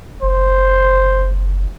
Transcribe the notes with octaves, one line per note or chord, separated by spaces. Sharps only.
F#1 C5